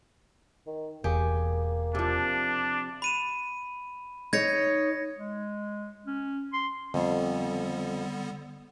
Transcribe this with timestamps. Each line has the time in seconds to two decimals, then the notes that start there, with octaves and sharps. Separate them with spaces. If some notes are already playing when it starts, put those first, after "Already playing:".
0.66 D#3
1.04 E1 A#3 G4 G#4 C#5
1.95 C3 F3 D4
3.02 B5 D#7 E7
4.33 D#4 C#5 G#6 A#6 C#7
5.17 G#3
6.06 C#4
6.53 C6
6.94 F2 D3 G3 B3